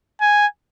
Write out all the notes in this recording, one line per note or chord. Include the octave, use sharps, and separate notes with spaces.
G#5